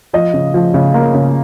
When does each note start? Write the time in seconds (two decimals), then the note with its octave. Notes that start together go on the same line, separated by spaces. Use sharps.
0.13 F3 D#5
0.34 C#3
0.54 F3
0.74 C#3
0.94 A#3
1.14 C#3